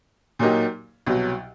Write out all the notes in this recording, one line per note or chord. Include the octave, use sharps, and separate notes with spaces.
A#2 F#3 A#3 D#4 G4
C2 B2 F#3